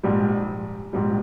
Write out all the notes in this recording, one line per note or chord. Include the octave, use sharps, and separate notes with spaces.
A#1 G#2 G3
A#1 G#2 G3